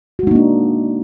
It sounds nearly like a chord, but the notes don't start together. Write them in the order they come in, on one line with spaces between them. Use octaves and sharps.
F#4 G#3 D#4 A#3 D4